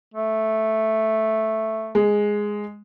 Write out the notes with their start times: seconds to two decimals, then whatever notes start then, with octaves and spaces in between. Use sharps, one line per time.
0.14 A3
1.95 G#3